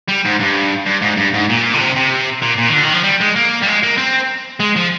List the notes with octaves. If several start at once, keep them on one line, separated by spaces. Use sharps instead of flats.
G3
G#2
G2
G2
G#2
G2
G#2
A#2
D3
C3
C3
A#2
A#2
D#3
D3
D#3
F3
G3
G#3
A#3
G3
G#3
A#3
C4
G#3
F3